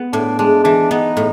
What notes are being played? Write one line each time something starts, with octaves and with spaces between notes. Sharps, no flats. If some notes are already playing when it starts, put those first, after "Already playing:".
Already playing: B3
A2 D4
G#3 D4
E3 D4
B3 D#4
A2